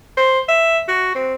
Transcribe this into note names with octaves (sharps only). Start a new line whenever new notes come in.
C5
E5
F#4
C4